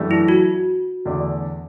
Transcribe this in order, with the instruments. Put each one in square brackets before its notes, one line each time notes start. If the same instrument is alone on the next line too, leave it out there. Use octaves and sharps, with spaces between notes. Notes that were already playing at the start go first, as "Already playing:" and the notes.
Already playing: [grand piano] F#2 E3 A3 D4 G4
[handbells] E4
F#4
[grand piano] E2 D3 A3 D4